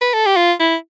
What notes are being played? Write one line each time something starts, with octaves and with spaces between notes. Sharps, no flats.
B4
A4
G4
F4
E4